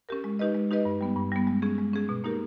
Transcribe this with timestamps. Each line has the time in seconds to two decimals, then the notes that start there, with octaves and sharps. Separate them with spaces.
0.09 C#4 G4 A#4
0.24 G#3
0.39 D#4 G4 B4 D#5
0.55 G#3
0.71 D#4 G4 B4 D#5
0.85 G2
1.01 G3 B3
1.16 G2
1.32 G3 B3
1.47 G#3
1.62 C#4 G#4
1.78 G#3
1.94 C#4 G#4
2.09 B2
2.24 A#3 D#4 G4 A#4